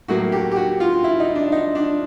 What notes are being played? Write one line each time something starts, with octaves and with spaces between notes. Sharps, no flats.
A2 F#3 A#3 F#4
G4
G4
F#4
F4
E4
D#4
D4
D#4
D4